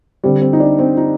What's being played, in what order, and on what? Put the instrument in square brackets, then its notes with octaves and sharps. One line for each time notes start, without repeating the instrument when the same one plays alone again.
[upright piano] D3 G3 C4
C4
D#4
D4
C4
D#4